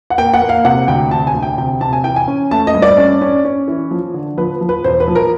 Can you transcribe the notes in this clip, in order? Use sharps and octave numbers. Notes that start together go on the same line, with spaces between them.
F#5
A#3 G5
F#5
A#3
F5
C3 F#5
D2 G5
C3 A5
G#5
D2
G5
C3 G5
C3 A5
G#5
E3 G5
G#5
C#4
A3 A5
D#5
G2
D5
C#4
C#4
C#4
E3
F3
D3
F3 B4
F3
B4
E1 C5
B4
F3
A#4